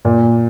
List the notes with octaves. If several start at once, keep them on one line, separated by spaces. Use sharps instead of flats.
A#2